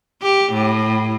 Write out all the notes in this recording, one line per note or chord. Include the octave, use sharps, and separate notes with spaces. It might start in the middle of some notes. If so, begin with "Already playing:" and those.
G4
A2